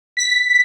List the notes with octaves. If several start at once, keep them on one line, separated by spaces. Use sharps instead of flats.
B6